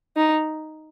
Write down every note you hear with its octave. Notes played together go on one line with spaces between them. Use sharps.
D#4